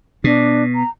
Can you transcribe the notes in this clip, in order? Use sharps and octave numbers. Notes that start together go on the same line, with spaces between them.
B2 D4
A#5